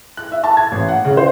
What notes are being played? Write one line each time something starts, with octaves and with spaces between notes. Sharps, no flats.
F#6
E5
A5
G#6
A1
F#5
C#3
C5